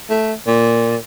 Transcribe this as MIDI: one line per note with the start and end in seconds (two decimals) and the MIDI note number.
0.10 0.33 57
0.47 0.96 46